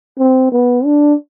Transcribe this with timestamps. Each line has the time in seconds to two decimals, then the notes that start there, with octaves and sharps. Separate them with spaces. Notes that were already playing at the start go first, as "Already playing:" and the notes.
0.19 C4
0.52 B3
0.85 D4